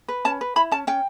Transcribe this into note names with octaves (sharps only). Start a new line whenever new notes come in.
B4
C#4 A5
B4
E4 B5
C#4 A5
C#4 G5